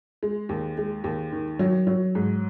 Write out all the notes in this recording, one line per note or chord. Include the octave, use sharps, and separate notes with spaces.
G#3
D#2
G#3
D#2
D#3
F#3
F#3
G#2